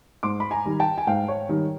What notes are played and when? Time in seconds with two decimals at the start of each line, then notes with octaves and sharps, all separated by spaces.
0.23 G#2 C6 D6
0.40 B5
0.51 G#5 A#5
0.66 D#3 G3
0.80 G5 A5
0.98 G#5
1.07 G#2 F5 G5
1.28 C#5
1.49 D#3 G3